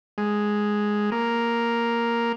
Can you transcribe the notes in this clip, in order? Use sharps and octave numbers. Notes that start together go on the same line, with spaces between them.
G#3
A#3